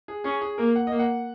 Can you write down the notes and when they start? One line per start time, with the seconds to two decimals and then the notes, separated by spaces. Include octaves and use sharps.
0.08 G#4
0.24 C#4 G#4
0.41 G#4
0.58 A#3 A#4
0.76 F#5
0.87 A#3 D#5
0.99 F#5